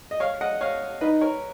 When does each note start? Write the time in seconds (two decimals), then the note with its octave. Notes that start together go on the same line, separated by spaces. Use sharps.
0.11 D#5
0.20 C#5 F5
0.41 D#5 F#5
0.61 C#5 F5
1.01 D#4 B4 D#5
1.21 A#4 C#5